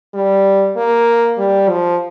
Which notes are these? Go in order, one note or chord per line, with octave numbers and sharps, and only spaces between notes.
G3
A#3
G3
F3